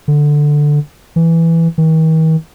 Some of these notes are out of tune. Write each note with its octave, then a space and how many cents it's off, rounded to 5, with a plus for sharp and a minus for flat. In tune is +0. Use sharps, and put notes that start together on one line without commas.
D3 +5
E3 +5
D#3 +45